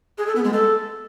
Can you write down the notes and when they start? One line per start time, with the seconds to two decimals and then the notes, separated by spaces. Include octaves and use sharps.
0.18 G#4
0.27 A4
0.36 B3
0.44 G#3
0.53 A4